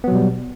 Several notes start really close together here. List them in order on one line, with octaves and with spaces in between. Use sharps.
B3 F#3 B2 G3